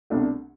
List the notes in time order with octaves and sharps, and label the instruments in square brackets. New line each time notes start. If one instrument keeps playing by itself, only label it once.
[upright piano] C2 B2 A3 D4